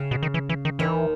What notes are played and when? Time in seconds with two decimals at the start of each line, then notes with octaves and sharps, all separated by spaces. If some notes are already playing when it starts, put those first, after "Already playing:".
Already playing: C#3
0.11 B2
0.23 D#3
0.34 E3
0.49 E3
0.65 D#3
0.79 D#2 D#3 E3